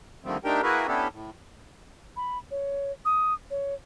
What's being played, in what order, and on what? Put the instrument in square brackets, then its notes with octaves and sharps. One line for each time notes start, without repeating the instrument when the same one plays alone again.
[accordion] D3 D#3 F3 G3 A3 C4
A3 D4 D#4 G4 A#4 G5
A#3 E4 F#4 G#4 A#4 B4
B3 C#4 D4 E4 G4 A4
A2
[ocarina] B5
C#5
D#6
C#5